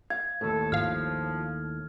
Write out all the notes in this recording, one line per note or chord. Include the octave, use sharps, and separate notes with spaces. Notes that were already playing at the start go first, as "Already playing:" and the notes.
F5 G#6
D#2 A2 A4
G#1 F3 F5 F6